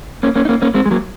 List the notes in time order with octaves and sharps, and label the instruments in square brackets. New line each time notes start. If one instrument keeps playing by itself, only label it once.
[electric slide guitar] A#3 C#4
A#3 C#4
D#4
A#3 C#4
A#3 C#4
G#3 C4
G#3
F#3 A#3